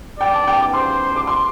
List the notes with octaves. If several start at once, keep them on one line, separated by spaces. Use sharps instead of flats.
D5 G5
A5
G5
D6
C5 C6
D6
C6